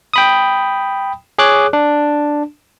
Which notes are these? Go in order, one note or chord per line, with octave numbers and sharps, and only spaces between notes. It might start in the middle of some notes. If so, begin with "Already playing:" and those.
G5 B5 D#6
G#4 C#5 D6 F#6
D4